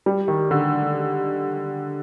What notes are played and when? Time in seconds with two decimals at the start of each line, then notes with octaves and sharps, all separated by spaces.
0.06 G3
0.28 D#3
0.51 D3